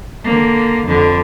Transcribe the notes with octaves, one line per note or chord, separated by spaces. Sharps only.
D3 A#3
F2 D3